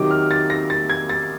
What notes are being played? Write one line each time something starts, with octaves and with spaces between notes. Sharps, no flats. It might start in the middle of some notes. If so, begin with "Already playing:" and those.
Already playing: C3 D#3 F#3 D6
F6
A6
A#6
A6
G#6
A6